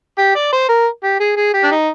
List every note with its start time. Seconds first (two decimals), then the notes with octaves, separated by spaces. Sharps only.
0.18 G4
0.35 D5
0.53 C5
0.69 A#4
1.04 G4
1.20 G#4
1.36 G#4
1.54 G4
1.63 D4
1.71 D#4